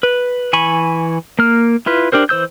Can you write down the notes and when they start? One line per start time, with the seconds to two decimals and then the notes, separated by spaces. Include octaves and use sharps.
0.03 B4
0.53 E3 G#5 B5 C#6
1.39 A#3 F6
1.86 E4 F4 B4
2.12 D4 G4 A#4 C5
2.29 E3 C5 E6 G6